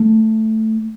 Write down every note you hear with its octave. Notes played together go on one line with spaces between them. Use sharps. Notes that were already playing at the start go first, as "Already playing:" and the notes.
Already playing: A3